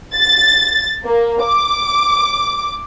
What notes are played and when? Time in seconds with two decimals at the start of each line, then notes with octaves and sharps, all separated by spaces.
0.16 A6
1.05 A#3
1.45 D6